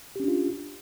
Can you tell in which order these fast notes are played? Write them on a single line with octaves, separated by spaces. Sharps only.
G4 C#4 D4 F4